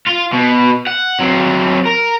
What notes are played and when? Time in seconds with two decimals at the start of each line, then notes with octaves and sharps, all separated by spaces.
0.07 F4
0.33 B2
0.87 F#5
1.20 F#3 C4
1.86 A#4